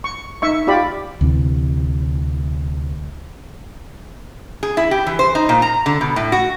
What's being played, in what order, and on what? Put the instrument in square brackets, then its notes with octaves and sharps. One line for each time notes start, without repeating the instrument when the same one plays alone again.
[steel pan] C#6
D#4 E5 C#6
F4 G4 D5 B5
[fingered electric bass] D2 C3 E3
[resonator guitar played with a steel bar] G#4
E4
G4
E3
C5
D#4
A#2
A#5
D3
B2
A2
F#4